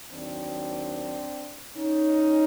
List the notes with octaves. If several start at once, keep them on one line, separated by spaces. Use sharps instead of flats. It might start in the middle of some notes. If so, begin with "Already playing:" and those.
D#2 D#3 F#3 C4 D4
C#4 D#4